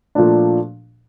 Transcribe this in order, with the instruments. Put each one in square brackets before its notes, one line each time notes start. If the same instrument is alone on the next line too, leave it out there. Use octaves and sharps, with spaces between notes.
[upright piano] A#2 F3 A3 D4